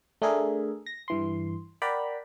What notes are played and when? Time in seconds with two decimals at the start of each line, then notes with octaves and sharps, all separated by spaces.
0.22 A3 D4 G#4 A#4 E5
0.86 A#6
1.08 G2 E3 C6
1.82 A#4 D5 F#5 G5 A#5 B5